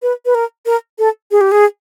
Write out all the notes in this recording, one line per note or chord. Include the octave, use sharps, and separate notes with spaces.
B4
B4
A#4
A#4
A4
G#4
G4
G#4